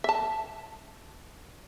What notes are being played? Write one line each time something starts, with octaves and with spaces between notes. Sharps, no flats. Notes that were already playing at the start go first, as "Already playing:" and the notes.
E5 A5